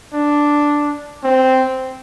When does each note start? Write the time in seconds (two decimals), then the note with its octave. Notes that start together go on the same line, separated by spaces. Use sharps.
0.14 D4
1.24 C4